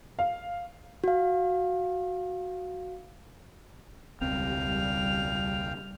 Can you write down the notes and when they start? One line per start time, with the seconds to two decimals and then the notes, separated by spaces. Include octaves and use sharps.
0.19 F5
1.04 F#4 F5
4.21 E1 C#2 G3 C4 F5 G5 F7